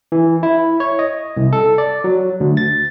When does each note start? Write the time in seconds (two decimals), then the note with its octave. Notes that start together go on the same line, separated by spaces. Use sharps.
0.12 E3
0.43 E4
0.80 C#5
0.99 D#5
1.37 C2
1.53 A4
1.78 D5
2.04 F#3
2.40 D2
2.57 A6